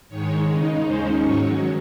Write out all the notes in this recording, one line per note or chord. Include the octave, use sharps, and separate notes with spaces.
G#2 D#3 G#3 C#5
C#3 G#3 D#4
D#2 D#3 G#3 C#4 C5
G#2 D#3 F#3 C#5